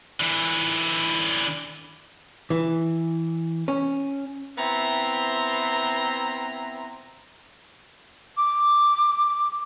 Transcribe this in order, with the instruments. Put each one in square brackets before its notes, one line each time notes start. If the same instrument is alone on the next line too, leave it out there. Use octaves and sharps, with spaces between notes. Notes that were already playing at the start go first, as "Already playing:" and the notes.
[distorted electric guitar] D3 E3
[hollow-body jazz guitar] E3
C#4
[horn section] B3 C4 E4 E5 A#5 C6
[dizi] D6